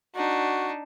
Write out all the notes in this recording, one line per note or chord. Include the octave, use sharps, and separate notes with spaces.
D4 D#4 F#4